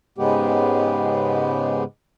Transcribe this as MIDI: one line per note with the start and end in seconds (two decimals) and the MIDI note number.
0.18 1.84 44
0.18 1.84 49
0.18 1.84 56
0.18 1.84 59
0.18 1.84 67